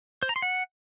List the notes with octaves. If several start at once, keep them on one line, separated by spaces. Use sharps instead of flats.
C5
A#5
C6
F#5